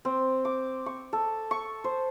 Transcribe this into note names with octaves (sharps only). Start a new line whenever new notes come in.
C4
D6
C#6
A4
C#6
C5